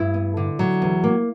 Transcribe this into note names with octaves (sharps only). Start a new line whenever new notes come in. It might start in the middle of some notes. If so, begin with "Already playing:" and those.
Already playing: G2 E4
B3
D3
F#3
E2
A#3